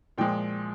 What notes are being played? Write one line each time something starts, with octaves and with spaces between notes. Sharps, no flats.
A#2 F3 G#3 G5